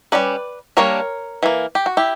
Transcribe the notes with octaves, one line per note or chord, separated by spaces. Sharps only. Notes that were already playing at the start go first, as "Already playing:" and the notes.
G3 C#4 B4 D5
G3 A#3 D4 A#4 C#5
E3 G3 A#3
G4
F#4
E4 G4